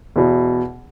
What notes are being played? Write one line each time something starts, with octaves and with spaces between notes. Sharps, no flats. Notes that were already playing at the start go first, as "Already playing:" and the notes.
E2 B2